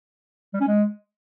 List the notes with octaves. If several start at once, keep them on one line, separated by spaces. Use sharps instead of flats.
G3
C#4
G#3